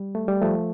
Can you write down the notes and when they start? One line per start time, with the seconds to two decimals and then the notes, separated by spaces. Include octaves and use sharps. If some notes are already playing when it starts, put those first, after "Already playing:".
Already playing: G3
0.15 A3
0.28 G3
0.42 F3 A3